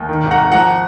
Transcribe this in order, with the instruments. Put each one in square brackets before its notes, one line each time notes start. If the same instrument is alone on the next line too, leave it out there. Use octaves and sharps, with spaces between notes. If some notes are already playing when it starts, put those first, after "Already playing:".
Already playing: [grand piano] D#2
D#3
G#1
F#5 A#5
G#1
F3 F#5 A#5